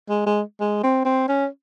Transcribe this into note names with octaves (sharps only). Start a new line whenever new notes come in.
G#3
G#3
G#3
C4
C4
C#4